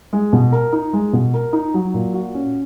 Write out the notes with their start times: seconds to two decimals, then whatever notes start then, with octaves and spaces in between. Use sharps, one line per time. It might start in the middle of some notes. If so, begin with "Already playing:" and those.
0.13 G#3
0.33 B2
0.52 A#4
0.73 D#4
0.93 G#3
1.13 B2
1.34 A#4
1.53 D#4
1.74 F#3
1.94 A#2
2.13 F#4
2.34 C#4